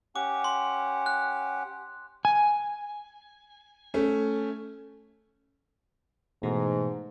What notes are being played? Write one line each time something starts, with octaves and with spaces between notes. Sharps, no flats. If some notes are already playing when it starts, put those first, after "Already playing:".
C#4 G4 F#5 D6
C6
F#6
G#5
A3 C#4
G#2 B2 E3 A3